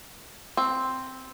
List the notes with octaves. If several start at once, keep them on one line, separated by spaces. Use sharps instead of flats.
C4